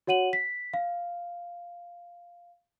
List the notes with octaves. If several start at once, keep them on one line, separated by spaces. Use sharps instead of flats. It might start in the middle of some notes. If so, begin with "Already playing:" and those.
F#4 C#5 F#5 D#7 F#7
B6
F5